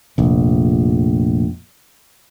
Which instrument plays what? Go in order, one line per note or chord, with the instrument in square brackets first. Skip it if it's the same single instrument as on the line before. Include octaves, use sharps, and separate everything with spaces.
[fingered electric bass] F1 A#1